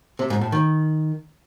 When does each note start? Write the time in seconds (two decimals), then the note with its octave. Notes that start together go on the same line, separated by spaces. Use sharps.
0.19 C3
0.30 G#2
0.41 A2
0.52 D#3